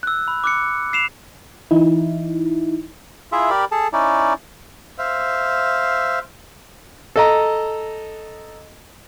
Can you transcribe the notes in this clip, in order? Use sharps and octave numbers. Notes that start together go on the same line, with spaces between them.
E6 F#6
B5
D6 F#6 C#7
C7 E7 F7
E3 D#4 E4
E4 F4 G#4 E5
G4 A#4 D5 B5
G#4 A4 A5
C#4 D#4 E4 D5
C5 E5 F5
A4 D#5 A#5